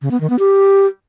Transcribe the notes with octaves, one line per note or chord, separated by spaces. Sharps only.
C#3
B3
D#3
B3
G4